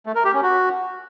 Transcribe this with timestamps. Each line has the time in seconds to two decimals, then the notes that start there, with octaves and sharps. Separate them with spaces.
0.06 A3
0.15 A#4
0.24 G4
0.34 C#4
0.43 F#4